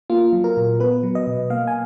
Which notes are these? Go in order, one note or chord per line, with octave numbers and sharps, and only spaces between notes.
A#3 F4
F#3
A#4
A#2
B3 B4
F#3
D#5
B2
A#3 F5
G#5